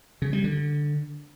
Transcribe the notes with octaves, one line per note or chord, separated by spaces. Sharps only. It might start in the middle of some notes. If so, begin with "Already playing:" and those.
C#3
G3
D3